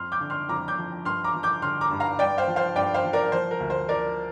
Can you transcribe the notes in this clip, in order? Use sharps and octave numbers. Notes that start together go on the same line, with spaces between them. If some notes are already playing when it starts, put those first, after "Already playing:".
Already playing: F2 C6 F6
D6 G6
D3
C6 F6
F2 A#5 D6
D6 G6
F3
G2 C6 F6
A#5 D6
F3
D6 G6
D3 C6 F6
A#5 D6
G2
F5 A#5
G2 D5 G5
C5 F5
F3
C5 F5
G2 D5 G5
C5 F5
F3
A#4 D5
F3 C5
A#4
D2
C5
F3 A#4 D5